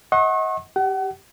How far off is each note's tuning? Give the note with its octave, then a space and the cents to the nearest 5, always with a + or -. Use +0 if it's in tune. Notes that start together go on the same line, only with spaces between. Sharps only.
D#5 +35 F#5 +0 C#6 -40
G4 +0 F#5 +35